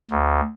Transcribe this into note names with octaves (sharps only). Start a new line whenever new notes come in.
D2